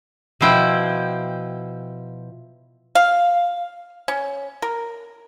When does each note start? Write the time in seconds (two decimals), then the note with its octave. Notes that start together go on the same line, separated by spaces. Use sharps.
0.41 B2 F3 E4 G5
2.95 F5
4.08 C#4
4.62 A#4